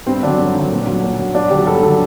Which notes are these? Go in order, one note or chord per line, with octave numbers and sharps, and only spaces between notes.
G2 C4
D3 F#3 D4
G2
D3 F#3
A#2
F#3
A#2
F#3
G2 D4
D3 F#3 G4
G2 A4
D3 F#3